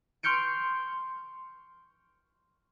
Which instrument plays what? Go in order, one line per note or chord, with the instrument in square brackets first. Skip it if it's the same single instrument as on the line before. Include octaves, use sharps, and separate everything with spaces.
[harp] C6 C#6 F6 G6 C#7 D7